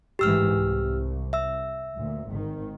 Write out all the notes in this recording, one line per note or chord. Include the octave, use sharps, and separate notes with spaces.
A1 G#2 E3 G4 E6 F6
C2
E5 E6
D2 A#2
G#1 D#3